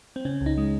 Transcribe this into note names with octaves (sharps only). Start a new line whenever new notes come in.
C4
C#3 C#4
C#2
D#4
G#3